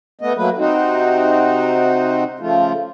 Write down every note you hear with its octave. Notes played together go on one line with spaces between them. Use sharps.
A3 B3 D#5
F#3 A3 A#3 B4
C3 C4 D#4 F#4
C#3 F3 A3 F4